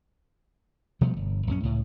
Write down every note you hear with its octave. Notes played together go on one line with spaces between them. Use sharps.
B2 F3 G3 A3
G1
A#1 F#2 C#4
C#2 A2